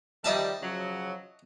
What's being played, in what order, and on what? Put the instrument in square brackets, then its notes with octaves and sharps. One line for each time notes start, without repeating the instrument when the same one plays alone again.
[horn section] D#3 F3 G3 [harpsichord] D#5 E5 A5
[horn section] C#3 F3 F#3